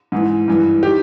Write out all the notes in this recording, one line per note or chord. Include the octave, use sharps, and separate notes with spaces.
G#2 E3
G2 E3
D#3 G4